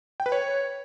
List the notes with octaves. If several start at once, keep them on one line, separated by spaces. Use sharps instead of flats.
G5
B4
C#5